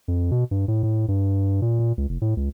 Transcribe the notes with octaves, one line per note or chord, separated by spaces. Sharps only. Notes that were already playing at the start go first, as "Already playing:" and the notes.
F2
B2
G2
A2
A2
G2
A#2
A#2
C#2
F1
A2
C#2